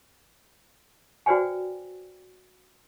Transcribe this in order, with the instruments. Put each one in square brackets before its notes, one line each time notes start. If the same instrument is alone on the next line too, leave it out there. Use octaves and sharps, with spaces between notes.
[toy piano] F#4 B4 C5 D5 G5 G#5